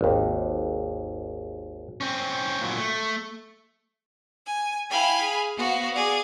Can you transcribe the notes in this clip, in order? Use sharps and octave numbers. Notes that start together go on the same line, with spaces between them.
G#1 D#2
C4 C#4
A#2 F#3
A3
G#5
E4 F5 G5 G#5 B5
G#4
B3 F#4 C5 F5 F#5
G#4 D5